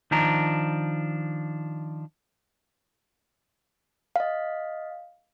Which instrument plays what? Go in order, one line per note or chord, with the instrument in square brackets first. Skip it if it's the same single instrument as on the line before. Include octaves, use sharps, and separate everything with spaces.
[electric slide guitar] D#3 F3 D4 A#5
[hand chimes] D#5 F5